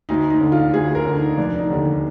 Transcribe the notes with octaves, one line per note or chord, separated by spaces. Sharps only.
D2 D#4
D#4
D3
F4
D2 G#4
A#4
D3
D#4
F1 D4
D#4
D#2 D3